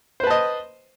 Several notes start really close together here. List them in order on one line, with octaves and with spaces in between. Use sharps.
C5 B4 A5 D#5